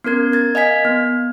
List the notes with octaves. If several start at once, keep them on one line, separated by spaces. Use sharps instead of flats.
B3 C#4 A#4 G#6
A#4 G#6 A6
D#5 F5 G#5 G#6 B6
B3